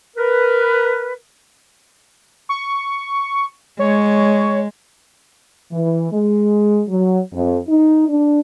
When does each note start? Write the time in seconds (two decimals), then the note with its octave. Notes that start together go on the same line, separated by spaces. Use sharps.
0.17 A#4 B4
2.49 C#6
3.79 G#3 C#5
5.72 E3
6.12 G#3
6.89 F#3
7.32 F2
7.68 D#4
8.09 D4